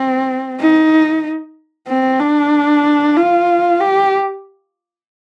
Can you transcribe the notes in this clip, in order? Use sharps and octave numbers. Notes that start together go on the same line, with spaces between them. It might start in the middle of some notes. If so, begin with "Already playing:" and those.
Already playing: C4
D#4
C4
D4
F4
G4